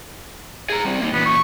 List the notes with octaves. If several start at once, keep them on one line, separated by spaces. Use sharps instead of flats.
G#4 A#5
G3 C4
A#3 D#4
E2 A#2 B3
C#6